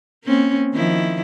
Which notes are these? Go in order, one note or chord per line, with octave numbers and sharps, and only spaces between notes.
A#3 C4 C#4
D#3 F3 E4